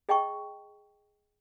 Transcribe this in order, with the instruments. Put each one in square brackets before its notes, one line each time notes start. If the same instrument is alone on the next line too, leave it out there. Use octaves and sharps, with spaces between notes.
[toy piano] G#4 D#5 G5 A5 C#6